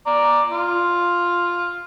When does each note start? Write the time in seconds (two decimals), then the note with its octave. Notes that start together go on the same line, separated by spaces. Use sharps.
0.06 D5 A#5
0.52 F4